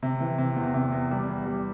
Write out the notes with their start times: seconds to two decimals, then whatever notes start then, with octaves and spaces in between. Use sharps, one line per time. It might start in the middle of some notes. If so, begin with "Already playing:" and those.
0.03 C3
0.20 E3
0.38 C3
0.56 E2
0.74 C3
0.93 E2
1.11 G3
1.29 E2
1.46 G3